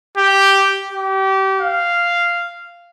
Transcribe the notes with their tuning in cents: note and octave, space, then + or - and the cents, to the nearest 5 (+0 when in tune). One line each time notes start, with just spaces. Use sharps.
G4 -5
G4 -30
F5 -10